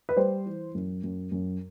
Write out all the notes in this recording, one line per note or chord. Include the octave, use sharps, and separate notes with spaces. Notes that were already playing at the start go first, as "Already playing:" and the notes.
B4
G3 C5
E3
F#2
F#2
F#2